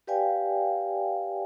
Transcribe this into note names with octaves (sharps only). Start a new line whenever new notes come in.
G4 B4 D5 F5 G5 G#5